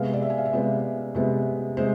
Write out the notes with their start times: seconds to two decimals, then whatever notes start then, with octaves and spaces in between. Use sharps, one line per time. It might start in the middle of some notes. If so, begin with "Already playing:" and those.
Already playing: C3 G#3 B3 F5
0.13 D5
0.22 E5
0.30 G#5
0.38 F5
0.45 E5
0.53 C3 G#3 B3 D5
1.15 C3 G#3 B3
1.77 C3 G#3 C5